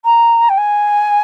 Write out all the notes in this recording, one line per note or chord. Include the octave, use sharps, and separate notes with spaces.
A#5
G5
G#5